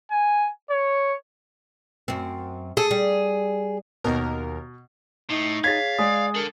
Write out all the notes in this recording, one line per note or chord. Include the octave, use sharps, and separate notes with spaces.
G#5
C#5
F#2 C4
G#4 A4
G3
D#2 B2 A#4
A2 D#4
G#4 C#5 F5 G#6 A6 B6
G#3 D5 D#6
D4 A4 A#4